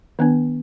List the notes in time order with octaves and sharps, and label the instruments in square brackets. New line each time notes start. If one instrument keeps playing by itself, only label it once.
[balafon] D#3 B3 D4